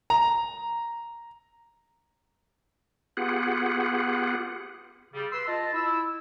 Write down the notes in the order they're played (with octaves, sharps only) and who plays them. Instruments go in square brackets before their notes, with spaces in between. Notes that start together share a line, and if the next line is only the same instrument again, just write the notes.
[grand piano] A#5
[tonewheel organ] B3 F4 G4 G#4 F#5
[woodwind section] C#3 G3
B4 C6 E6
F4 D#5 A5
E4 E6